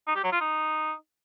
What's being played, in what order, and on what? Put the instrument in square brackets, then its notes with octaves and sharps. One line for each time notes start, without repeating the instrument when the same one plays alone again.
[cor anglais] D#4
G4
F#3
F4
D#4